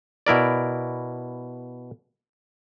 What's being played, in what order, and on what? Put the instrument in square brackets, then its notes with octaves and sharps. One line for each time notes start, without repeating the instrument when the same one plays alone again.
[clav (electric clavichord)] B2 E4 A#4 D5